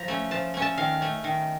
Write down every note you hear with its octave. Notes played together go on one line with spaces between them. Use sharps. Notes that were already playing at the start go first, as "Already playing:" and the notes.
Already playing: F3 A#5
A3 C#4
F3 A5
A3 C#4
A5
D#3 F5
A3 C#4
D#3